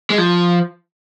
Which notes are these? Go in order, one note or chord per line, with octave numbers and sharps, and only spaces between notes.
G#3
F3